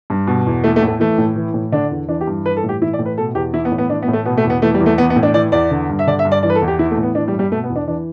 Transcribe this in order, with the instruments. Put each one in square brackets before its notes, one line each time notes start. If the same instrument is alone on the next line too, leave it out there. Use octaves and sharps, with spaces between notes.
[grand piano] G2
B2
E2
E3 A3
A3
A2
A3
E3 A3
A2
E3
A2
D3 D4
E2
E3 D4
G4
G2
E3 B4
A4
A2
G4
E3 E4
D5
A2
B4
B2 A4
E2 G4
E3 E4
B3
A2
B3
E3 D4
B3
A2
A3
B2 B3
A3
E2
B3
E3 A3
G3
E2
A3
E3 B3
B3
A2
D4
E3 D5
E2 D5
D3
G2
E5
D3 D5
E5
G2
D5
E3 D5
B4
A4
E2
G4
E3 E4
A3
A2
B3
E3 D4
G3
G2
G3
B2 A3
B3
E2
D4
E3 D4